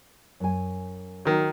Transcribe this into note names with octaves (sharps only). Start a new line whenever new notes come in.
F#2 G#5
D#3 F#3